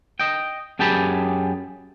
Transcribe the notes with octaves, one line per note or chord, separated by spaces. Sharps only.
D#5 G5
F#2 G4 G#4 G5 A5 B5